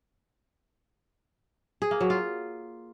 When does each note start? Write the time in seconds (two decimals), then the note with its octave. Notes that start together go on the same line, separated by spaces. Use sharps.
1.82 G#4
1.91 A#3
2.01 F#3
2.10 F4